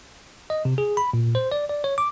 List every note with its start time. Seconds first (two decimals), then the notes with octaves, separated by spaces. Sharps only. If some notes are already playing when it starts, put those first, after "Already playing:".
0.50 D#5
0.65 C3
0.78 G#4
0.97 B5
1.13 A#2
1.35 C5
1.52 D5
1.69 D5
1.84 C#5
1.98 D6